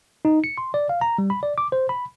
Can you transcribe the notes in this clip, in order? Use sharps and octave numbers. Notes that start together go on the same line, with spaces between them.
D#4
C#7
C6
D5
F5
A#5
G3
B5
D5
D6
C5
B5